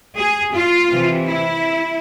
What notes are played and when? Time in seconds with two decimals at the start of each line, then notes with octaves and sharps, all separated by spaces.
0.18 G#4
0.54 F4
0.89 C3 E3
1.26 E4